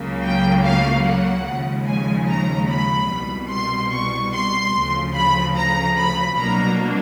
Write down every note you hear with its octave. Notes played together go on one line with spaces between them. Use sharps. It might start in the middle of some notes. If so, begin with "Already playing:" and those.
Already playing: C#2 C#3 F#3 A#3
G5
F5
F#5
D#2 C#3 F3 G#3
G#5
A#5
B5
C2 B2 G3
C6
C#6
C6
D2 C#3 F3
B5
A#5
B5
C2 B2 F#3 A#3 D4 A#5